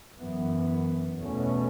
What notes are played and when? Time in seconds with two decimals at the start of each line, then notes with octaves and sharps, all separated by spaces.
0.19 F#2 E3 B3
1.18 E2 B2 A3 C#4